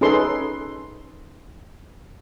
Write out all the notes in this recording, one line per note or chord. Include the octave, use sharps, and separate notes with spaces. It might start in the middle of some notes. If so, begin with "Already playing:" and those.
C#4 D#4 G#4 A4 B4 C6